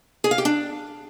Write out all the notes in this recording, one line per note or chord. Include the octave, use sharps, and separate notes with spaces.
G#4
F5
G4
D4